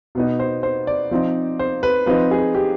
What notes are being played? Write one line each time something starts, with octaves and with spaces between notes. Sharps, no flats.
B2 B3 D#4
C5
C5
D5
F3 C4 D#4
C5
B4
F3 C4 D#4 B4
G#4
G4